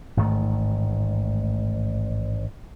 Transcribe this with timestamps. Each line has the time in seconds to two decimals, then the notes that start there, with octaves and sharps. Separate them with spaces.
0.17 A1 G#2 D#3 A3